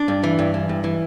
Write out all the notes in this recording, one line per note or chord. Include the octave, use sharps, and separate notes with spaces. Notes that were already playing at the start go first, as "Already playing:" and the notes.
Already playing: D4
G2
E3
G2
E3
G2
E3